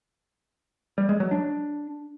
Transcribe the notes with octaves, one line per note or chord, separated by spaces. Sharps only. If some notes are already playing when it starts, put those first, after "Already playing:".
G3
G#3
F#3
D4